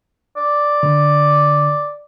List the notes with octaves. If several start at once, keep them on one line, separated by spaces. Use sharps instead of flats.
D5
D3